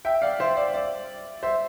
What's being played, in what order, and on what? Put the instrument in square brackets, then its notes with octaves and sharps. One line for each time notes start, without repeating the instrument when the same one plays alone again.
[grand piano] E5 G5
D5 F5
C5 E5
D5
D5
C5 E5